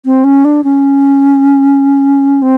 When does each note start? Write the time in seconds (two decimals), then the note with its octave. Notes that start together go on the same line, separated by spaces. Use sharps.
0.05 C4
0.24 C#4
0.45 D4
0.64 C#4
2.42 C4